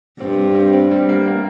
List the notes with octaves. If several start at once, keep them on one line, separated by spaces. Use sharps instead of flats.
G2 C4
C4
C4
C4
G3
A#3
A#3